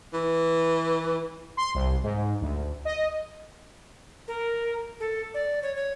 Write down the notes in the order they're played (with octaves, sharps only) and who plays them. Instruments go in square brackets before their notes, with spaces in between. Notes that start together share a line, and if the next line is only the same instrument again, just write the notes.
[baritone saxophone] E3
[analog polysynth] C6
C2
G#2
D2
D#5
[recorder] A#4
A4
D5
C#5
C#5